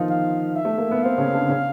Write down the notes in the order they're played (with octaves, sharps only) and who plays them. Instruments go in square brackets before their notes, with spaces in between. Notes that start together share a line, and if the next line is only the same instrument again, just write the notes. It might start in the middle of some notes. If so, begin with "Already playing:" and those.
Already playing: [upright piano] D#3 F3 D#4 F4
[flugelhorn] F5
E5
[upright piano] A3
A#3
B3
[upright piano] C4 [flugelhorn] F5
[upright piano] C#3 C#4
D3 D4
C#3 C#4